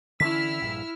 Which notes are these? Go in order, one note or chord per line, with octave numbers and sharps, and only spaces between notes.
D3 E3 C#4 E4 E6 F6 B6
A#1 G2 A#2